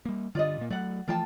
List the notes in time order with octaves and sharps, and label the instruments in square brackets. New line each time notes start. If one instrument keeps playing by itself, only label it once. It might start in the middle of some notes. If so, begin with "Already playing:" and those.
[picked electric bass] G3 A#3
[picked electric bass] G2 D3 [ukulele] F4 D5 D#5
[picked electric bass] A#2 A#3
[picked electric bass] F#3 A3 [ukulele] D5 F#5
[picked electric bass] E3 F3 A3 [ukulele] F4 G5 A5